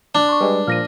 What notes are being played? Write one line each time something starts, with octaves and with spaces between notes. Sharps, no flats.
D4 F#6
C6 C#6
G3 G#3 B4
A#2 F3 F6 A#6 D#7